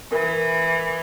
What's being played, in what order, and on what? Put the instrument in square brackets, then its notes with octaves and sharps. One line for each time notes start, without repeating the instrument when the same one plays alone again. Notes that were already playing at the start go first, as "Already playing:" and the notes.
[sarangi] E3 [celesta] A#4